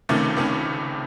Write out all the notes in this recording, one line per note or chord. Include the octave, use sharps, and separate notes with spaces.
C#2 C3 D#3 A3 C#4
C#2 C3 D#3 A3 C#4